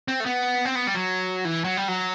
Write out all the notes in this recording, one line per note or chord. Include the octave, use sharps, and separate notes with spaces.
C4
A3
B3
C4
B3
G3
F#3
E3
F#3
G3
F#3